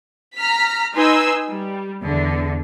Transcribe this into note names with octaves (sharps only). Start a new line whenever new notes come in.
A#5 F6 B6
D#4 B4 G#5 C6 E6
G3
E2 D3